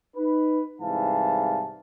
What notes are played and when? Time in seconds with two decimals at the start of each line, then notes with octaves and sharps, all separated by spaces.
0.17 D#4 B4
0.81 C2 G#2 E3 F5 A5